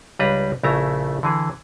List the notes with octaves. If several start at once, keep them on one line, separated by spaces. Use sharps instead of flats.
C#2 G3 D4 B4 A#5
A#1 C#3 A3 E4 A#5
D3 E3 G#4